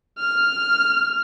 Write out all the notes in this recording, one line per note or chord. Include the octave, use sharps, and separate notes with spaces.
F6